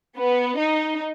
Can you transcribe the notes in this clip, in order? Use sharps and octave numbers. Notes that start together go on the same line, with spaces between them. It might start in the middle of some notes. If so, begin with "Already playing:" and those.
B3
D#4